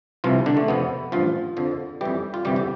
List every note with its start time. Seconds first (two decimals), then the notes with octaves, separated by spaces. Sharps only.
0.24 C2 C3 E3 F3 F4
0.46 D3 D4
0.57 A3
0.68 F2 C3 F3 B3
1.12 A1 G2 F3 F4
1.57 F2 D3 F3
2.01 F2 E3 G3 G4
2.34 F4
2.45 G1 F2 C3 E3 G3 G4
2.56 G4